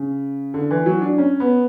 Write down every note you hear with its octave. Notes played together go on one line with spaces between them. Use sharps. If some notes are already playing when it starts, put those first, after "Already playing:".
Already playing: C#3
D3
E3
F#3
D4
C#4
B3